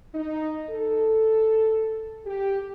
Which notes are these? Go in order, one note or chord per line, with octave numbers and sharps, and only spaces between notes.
D#4
A4
G4